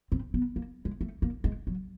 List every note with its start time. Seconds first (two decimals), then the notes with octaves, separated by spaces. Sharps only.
0.12 C4
0.34 B3
0.56 A#3
0.85 G#3
1.01 A3
1.22 A#3
1.44 G#3
1.67 F#3